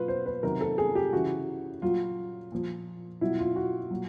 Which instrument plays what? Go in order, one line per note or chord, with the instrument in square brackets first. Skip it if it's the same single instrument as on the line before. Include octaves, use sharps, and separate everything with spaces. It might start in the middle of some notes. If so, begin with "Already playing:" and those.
Already playing: [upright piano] B2 F#3 F4 B4
C5
B4
C3 D#3 F#3 A#4
A4
G#4
G4
C#3 E3 F#4
A#2 F#3 F4
A#2 F3
B2 F#3 E4
F4
F#4
A#2 F#3